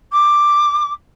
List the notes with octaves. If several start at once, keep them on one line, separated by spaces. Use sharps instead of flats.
D6